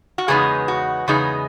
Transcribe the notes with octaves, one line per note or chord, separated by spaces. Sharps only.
F#4
E2 C#3 G#3 B3 D#4 G#4
F#4
E2 C#3 G#3 B3 D#4 G#4